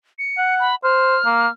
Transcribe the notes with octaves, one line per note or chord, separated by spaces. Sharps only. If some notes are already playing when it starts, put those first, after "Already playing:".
C#7
F#5
B5
C5 F6
A#3